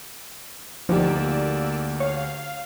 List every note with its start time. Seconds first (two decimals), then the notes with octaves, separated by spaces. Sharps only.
0.89 D2 F3 A#3 D#4 G4 D5 E6
2.00 C#5 F5